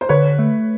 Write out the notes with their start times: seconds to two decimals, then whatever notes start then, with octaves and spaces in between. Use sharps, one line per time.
0.01 C5
0.09 D3 B4 C#5
0.39 A3